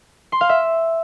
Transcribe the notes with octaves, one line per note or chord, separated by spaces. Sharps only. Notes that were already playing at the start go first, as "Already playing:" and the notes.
C6
F5
E5